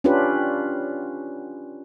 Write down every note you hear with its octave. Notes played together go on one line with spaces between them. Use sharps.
C#4 D4 F4 G4 B4